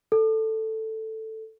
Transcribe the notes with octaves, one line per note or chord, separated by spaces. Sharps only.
A4